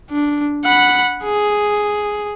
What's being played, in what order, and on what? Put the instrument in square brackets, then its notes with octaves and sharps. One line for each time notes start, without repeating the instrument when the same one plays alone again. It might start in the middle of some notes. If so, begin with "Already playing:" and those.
[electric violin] D4
F#5 B5
G#4